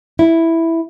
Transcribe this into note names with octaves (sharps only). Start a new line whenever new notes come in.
E4